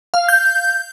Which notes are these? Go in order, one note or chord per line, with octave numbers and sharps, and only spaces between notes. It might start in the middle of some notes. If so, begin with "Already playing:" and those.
F5
G6